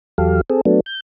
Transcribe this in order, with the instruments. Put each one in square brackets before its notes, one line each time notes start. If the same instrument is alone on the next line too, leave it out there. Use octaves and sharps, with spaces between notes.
[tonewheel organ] E2 F#3 G4 A4 F5
C4 G#4 A4
F#3 A3 B3 D4
G6